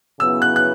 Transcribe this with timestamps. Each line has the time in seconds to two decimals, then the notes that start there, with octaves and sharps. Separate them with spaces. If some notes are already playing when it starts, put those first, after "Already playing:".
0.20 C#3 F#3 B3 E4 E6
0.42 F#6
0.56 F#6